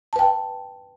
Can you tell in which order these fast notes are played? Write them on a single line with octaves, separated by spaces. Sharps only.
A5 B4 G5